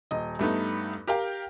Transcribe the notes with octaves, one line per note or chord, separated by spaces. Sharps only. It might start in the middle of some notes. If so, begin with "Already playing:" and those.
D#1 D#5
G2 A3 B3 D#4
G4 A#4 F5 G5